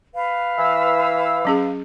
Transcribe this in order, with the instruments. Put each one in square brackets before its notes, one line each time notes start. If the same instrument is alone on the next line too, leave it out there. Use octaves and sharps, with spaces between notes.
[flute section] B4 F5
[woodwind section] E3 E6
[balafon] F#3 C#4 G#4